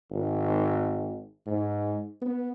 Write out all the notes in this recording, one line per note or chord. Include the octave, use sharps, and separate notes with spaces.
G#1
G#2
B3